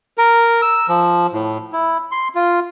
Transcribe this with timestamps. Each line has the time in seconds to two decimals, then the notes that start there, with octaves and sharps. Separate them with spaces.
0.18 A#4
0.62 E6
0.88 F3
1.33 A2
1.73 E4
2.11 C6
2.35 F4